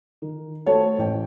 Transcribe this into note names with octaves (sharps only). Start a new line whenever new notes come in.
D#3
A3 F#4 A4 C5 C#5 A5
A1 G5